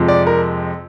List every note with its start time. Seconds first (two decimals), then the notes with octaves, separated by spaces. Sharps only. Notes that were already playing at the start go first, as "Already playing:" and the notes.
Already playing: F2 C3 F3 G#3
0.08 D5
0.27 A#4